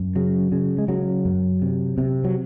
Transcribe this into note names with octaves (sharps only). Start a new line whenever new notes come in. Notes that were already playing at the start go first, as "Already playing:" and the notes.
Already playing: F#2
C#3 F#3
C#3
G#3
C#3 F#3
F#2
C3
C3
F#3